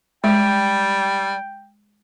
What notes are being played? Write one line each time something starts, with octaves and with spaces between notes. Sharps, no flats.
G3 G#3 G5